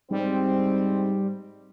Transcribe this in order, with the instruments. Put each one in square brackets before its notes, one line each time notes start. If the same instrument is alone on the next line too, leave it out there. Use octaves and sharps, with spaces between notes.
[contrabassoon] G#2 [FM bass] G3 [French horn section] C4